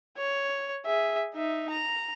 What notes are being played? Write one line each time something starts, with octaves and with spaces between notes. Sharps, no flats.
C#5
G#4 E5
D#4 E5
A#5